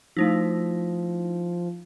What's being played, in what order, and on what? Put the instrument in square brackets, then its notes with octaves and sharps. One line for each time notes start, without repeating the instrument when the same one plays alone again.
[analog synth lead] F3 [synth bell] A3 D#4 E4